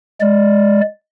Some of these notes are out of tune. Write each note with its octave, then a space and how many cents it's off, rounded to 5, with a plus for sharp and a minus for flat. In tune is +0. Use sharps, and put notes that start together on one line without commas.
G#3 +0 D5 +0